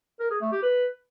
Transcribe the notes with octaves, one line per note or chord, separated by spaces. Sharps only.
A#4
G#4
A3
G4
B4